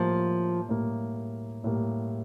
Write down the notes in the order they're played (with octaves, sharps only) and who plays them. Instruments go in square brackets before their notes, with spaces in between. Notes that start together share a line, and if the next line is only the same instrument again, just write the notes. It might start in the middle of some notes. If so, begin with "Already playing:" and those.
Already playing: [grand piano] A2 G3 A#3 [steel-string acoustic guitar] F3
[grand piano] A2 G3 A#3
A2 G3 A#3